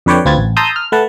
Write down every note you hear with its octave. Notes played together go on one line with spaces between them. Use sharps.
F2 D3 B4 C#5 D5 G5
D2 C4 F4 B4 G#6 A6
A1
A5 A#5 C6 D#6 E6 G6
F6
A3 B4 F#5 A5